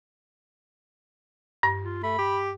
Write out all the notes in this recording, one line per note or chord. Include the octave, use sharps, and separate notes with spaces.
G2
F4
A3 B5
G4